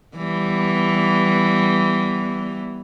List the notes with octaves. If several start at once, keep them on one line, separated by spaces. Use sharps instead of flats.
E3 G3 B3